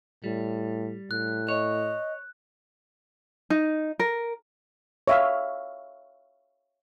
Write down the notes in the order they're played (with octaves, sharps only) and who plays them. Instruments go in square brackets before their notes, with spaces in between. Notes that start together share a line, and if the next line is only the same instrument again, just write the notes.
[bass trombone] A2 [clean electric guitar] G3
[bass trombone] A2 [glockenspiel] F#6
[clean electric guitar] C#5 [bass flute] D#5
[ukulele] D#4
A#4
[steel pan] C#5 E5 F5